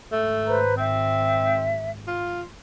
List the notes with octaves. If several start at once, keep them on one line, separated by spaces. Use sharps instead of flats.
G#1 A3
B4 C5 A#5
C4 E5
F4